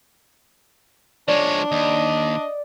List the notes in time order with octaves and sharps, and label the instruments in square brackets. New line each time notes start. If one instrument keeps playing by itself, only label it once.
[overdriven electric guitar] F3 G#3 [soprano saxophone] D4 [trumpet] C#5 [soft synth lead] D5
[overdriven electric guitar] D#2 [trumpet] D#5